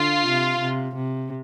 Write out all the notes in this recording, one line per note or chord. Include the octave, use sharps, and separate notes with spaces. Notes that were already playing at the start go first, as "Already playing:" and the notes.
Already playing: D3 F4
C3
C3
C3